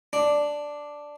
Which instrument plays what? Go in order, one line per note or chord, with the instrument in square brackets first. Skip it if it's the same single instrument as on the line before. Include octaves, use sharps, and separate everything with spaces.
[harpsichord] D4